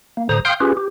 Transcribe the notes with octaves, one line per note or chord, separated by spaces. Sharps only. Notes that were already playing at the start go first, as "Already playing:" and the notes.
A#3
A2 D3 C5 A#5 D#6
F5 G5 C6 D#6 F6 G6
C#4 F4 G4 G#4 B4
G4